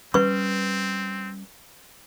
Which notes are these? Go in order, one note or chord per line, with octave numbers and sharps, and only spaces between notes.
G3 C4 C#4 B4 C#6